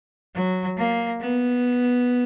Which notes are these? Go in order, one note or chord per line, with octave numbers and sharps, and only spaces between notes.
F#3
A#3
B3